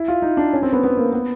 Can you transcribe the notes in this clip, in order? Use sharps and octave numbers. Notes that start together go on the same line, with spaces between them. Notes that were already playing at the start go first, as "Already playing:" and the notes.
Already playing: E4
F4
D#4
D4
C#4
C4
B3
B3
A#3
B3